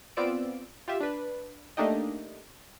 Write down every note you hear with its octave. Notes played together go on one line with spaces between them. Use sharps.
B3 C4 F4 D5 E6 D7
F4 G4 E5
D4 B4
A3 A#3 D4 D#4 G4 D#5